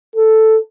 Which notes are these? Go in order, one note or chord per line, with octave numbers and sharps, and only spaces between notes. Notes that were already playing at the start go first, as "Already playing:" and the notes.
A4